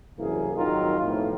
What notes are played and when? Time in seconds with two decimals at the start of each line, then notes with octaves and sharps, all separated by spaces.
0.19 C2 F#2 E3 A#3 G#4
0.56 G#1 F2 D#3 F#3 F4 A#4
0.99 B1 F2 A2